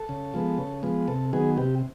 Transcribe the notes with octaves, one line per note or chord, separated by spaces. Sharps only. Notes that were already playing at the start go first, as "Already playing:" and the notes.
Already playing: A4
C#3
F3 G#3 B3
C#3
F3 G#3 B3
C3 A4
D#3 F#3 B3 G#4
C3 G4